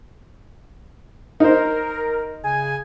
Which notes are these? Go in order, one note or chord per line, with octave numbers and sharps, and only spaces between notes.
D#4 A#4 C5
C#3 G#4 G#5